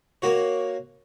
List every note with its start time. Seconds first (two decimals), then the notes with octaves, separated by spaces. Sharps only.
0.22 A#3 F#4 C#5